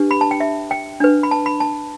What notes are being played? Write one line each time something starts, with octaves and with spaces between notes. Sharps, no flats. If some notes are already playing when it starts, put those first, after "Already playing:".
Already playing: D4 G4 B4
B5
A5
G5
E5
G5
D4 B4
B5
A5
B5
A5